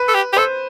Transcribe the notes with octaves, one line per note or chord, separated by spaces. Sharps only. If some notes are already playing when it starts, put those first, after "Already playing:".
Already playing: B4
A4
G4
G4
A4 C5